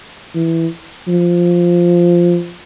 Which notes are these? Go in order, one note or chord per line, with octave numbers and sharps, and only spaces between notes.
E3
F3